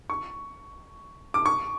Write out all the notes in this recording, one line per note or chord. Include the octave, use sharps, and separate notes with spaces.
C#6
D6
C#6